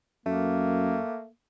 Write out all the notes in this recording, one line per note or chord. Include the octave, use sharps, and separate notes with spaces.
F#2 A3 A#3